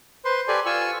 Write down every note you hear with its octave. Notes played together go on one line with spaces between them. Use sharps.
B4 C5 C6
G4 A4 B4 D5 G#5
F4 G#5 C#6 E6